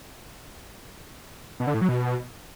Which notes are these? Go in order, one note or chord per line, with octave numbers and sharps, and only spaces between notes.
B2
D3
A2
F#3
B2